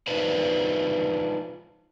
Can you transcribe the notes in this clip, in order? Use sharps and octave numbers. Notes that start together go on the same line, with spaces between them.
D4 D#4 F4 B4 C5 D5